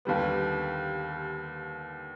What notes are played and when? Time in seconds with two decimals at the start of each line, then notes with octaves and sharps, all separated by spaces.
0.05 D#2 D3 G3 B3